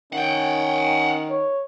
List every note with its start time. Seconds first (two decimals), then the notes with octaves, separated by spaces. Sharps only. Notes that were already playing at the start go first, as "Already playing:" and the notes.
0.13 D#3 C#4 F#5 G5
1.29 C#5